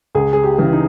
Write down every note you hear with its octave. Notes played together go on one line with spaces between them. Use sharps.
C#2 G#4
G#4
G4
C#3 E3
D#4